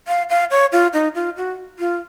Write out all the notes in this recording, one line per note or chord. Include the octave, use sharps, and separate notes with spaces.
F5
F5
C#5
F4
D#4
F4
F#4
F4